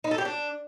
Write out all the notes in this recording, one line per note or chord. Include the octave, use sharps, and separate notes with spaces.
D#4
A4
G4
D4